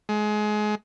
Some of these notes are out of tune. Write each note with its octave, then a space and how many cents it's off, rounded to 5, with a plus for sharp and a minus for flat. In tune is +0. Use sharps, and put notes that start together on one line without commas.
G#3 +25